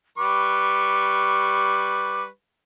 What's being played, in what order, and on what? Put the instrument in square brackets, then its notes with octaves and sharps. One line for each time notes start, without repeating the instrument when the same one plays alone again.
[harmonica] G3 B4 C#6 [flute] D6